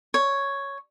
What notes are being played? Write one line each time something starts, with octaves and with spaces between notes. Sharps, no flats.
C#5